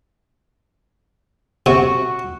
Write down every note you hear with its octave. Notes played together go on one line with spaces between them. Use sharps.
C3 F#4